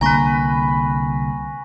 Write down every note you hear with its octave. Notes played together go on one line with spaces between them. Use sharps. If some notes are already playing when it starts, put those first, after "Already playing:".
C2 D3 A#3 B4 G#5 A#5 C#6 A#6